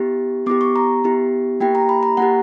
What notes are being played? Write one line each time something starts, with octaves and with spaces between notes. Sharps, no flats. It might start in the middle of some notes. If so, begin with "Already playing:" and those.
Already playing: B3 E4 G4
B3 E4 G4 D6
C#6
A#5
B3 E4 G4
A#3 E4 G4 G5
A#5
B5
A#5
A#3 E4 G4 F#5